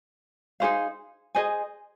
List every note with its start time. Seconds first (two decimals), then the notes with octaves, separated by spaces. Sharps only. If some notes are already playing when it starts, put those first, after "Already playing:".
0.60 D#4 G#4 C5 F5
1.35 G#4 C5 D#5 G#5